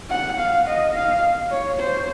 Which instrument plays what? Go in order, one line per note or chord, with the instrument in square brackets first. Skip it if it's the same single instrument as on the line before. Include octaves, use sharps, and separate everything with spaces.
[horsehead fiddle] F#5
F5
D#5
F5
C#5
C5